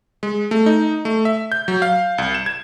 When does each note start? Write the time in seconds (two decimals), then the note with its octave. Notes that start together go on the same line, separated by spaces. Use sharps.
0.23 G#3
0.51 A3
0.66 D#4
1.05 A3
1.25 E5
1.52 G6
1.68 F#3
1.82 F5
2.18 C2
2.34 E7
2.46 G#6